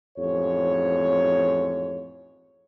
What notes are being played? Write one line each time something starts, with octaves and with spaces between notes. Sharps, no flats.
A1 F2 G#2 C#5